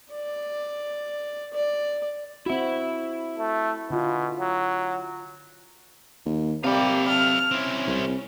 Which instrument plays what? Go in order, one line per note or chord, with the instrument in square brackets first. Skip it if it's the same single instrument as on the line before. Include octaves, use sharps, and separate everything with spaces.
[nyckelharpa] D5
D5
[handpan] C4 F#4 [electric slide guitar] E4 E5
[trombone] A3
[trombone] B2 [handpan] D3 F4
[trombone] F#3
[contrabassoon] D#2
[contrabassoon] C3 [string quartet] G3 A#3 [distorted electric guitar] A4 F5
[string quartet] A5 F6
[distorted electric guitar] C4 E4 [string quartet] C#4
[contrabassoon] C2